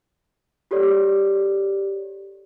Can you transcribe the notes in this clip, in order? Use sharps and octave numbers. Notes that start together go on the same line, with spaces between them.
F#4 G4 A4 C#5 D5